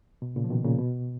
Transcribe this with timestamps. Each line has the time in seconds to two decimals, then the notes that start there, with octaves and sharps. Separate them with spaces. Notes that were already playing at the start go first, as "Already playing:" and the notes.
0.22 B2
0.36 A#2 C#3
0.44 F3
0.50 B2 D#3
0.64 A#2 C#3
0.79 B2